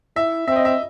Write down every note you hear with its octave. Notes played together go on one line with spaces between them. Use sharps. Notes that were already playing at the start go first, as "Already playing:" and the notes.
E4 E5
C4 E5
D#5
E5